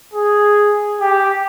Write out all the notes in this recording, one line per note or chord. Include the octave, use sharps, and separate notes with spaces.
G#4
G4